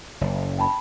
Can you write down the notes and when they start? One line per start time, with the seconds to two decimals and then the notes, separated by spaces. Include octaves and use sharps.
0.21 F#1
0.59 G5 A5 B5